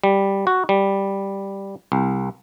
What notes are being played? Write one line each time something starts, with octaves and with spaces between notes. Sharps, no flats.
G3
F#4
G3
C2